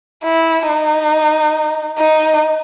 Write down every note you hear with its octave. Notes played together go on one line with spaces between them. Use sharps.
E4
D#4
D#4